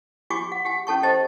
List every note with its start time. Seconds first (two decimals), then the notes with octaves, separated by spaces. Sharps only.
0.30 F#4 G4 G#5 C#6 D6
0.52 F#5
0.65 G4 F#5 G#5
0.87 C#4 A4 A5 C#6
1.03 G4 C5 D#5 A5